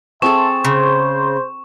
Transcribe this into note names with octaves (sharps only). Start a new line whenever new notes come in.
C4 G#4 A4 E5 A5 C6 C#6 E7
C#3 C5